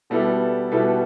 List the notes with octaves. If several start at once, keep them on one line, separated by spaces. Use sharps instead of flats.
B2 G3 B3 E4 A4
B2 G3 B3 E4 A4